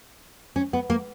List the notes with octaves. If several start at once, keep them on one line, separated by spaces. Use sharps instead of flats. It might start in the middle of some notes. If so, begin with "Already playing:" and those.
C#4
B3
A#3